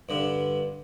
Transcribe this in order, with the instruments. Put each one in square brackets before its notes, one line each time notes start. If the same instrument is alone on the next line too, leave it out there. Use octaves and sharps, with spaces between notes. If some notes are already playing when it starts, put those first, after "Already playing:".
[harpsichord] G2 D3